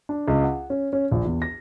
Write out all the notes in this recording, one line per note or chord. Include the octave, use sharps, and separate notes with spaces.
D4
C#2
F#5
C#4
C#4
A#1
E2
A#6